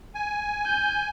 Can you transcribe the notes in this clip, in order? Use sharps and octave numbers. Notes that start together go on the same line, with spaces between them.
G#5
G6